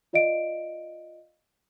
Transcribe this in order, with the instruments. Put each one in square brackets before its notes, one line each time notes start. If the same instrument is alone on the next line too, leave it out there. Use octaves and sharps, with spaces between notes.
[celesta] F4 D5 D#5 F5 D7